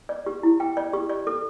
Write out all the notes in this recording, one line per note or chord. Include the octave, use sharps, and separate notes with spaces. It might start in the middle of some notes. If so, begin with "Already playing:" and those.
D5
G4
E4
G5
D5
G4
D5
A4